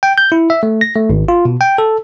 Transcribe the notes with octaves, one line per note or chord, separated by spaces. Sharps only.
G5
G6
E4
E5
A3
A#6
A3
G#1
F4
B2
G5
A4